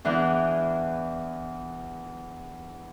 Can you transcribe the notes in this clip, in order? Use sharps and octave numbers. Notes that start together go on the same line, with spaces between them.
E2 E3 D4